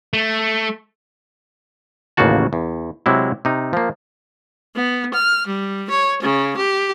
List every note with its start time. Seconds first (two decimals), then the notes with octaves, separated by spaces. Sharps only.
0.13 A3
2.17 A1 D#2 C#3 A#3 F#4 A5
2.53 E2
3.06 C3 F#3 G#3 E4
3.45 C3 D#4
3.73 F3 A#3
4.75 B3
5.13 F6
5.46 G3
5.89 C#5
6.22 C#3
6.56 G4